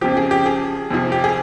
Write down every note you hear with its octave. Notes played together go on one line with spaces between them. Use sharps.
F2 C#3 F3 G4
G#4
G4
G#4
F2 C3 F3
G4
G#4